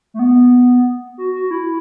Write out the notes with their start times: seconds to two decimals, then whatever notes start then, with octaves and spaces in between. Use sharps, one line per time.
0.14 A3
0.19 B3
1.18 F#4
1.34 F#4
1.51 E4